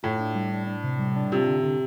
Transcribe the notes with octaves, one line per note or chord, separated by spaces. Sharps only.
A2 F4
D4
G3
D4
D4
C3
G3
D4
C3 F4
D3
D3